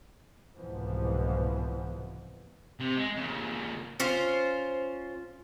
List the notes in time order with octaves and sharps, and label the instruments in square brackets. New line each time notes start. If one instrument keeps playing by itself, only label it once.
[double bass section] C2 G#2 B2 E3 F3 B3
[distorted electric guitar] C3
G#3
A#2 C#3
[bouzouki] C#4 F4 C5